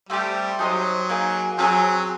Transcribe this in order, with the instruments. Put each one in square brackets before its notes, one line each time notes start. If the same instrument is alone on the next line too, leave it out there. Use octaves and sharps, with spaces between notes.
[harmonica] G3 [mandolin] A3 C4 D#4 G4
[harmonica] F#3 [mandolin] D#4 G#4 C5 D#5
[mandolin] A#3 D#4 G#4
[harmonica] F#3 [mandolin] C4 D#4 G#4